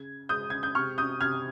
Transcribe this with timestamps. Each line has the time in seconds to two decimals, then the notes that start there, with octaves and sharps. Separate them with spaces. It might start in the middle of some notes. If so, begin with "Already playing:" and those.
Already playing: C#3 G#6
0.29 G#3 D#6 G6
0.50 G#6
0.63 G6
0.75 C3 C#6 F6
0.98 D#6 G6
1.21 C3 F6 G#6